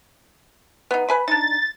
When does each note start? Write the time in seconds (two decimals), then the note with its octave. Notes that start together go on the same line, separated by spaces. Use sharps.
0.91 B3 D#4
1.09 B4 G#5 B5
1.28 D4 D#4 A6